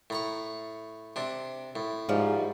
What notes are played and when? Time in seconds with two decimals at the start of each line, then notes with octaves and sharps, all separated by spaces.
0.10 A2 A#5 C#6
1.16 C3 D4
1.76 A2
2.09 G#2 F3 G3